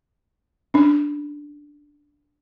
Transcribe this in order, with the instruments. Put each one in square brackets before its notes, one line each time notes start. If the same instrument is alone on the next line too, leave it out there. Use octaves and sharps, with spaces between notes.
[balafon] C#4 D4